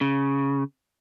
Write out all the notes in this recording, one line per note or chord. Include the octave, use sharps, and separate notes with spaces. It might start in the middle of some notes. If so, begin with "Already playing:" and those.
C#3